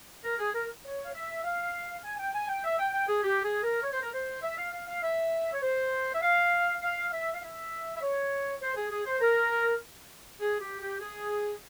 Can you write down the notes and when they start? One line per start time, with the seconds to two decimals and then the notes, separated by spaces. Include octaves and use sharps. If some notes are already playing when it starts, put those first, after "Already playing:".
0.24 A#4
0.39 G#4
0.54 A#4
0.85 C#5
1.05 F5
1.14 E5
1.44 F5
2.04 G#5
2.19 G5
2.34 G#5
2.49 G5
2.64 E5
2.79 G5
2.93 G5
3.08 G#4
3.23 G4
3.44 G#4
3.63 A#4
3.84 C#5
3.93 C5
4.03 A#4
4.13 C5
4.43 E5
4.58 F5
4.73 F5
4.88 F5
5.03 E5
5.54 C#5
5.62 C5
6.13 E5
6.22 F5
6.82 F5
7.12 E5
7.34 F5
7.42 E5
7.97 E5
8.02 C#5
8.62 C5
8.76 G#4
8.91 G#4
9.06 C5
9.21 A#4
10.40 G#4
10.61 G4
10.81 G4
11.00 G#4